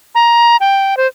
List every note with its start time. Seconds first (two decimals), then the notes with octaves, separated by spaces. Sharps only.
0.15 A#5
0.60 G5
0.97 C5